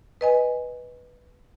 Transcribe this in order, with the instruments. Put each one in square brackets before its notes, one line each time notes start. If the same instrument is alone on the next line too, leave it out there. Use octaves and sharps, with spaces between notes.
[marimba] B4 D#5 G#5